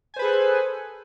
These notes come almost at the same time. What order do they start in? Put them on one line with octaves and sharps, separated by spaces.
G#5 C5 B4 G#4 A4